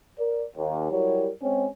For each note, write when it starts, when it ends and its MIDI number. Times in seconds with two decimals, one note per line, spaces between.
0.18 0.45 70
0.18 0.45 74
0.56 0.89 39
0.90 1.29 54
0.90 1.29 55
0.90 1.29 64
0.90 1.29 67
0.90 1.29 70
0.90 1.29 73
1.42 1.67 56
1.42 1.67 60
1.42 1.67 61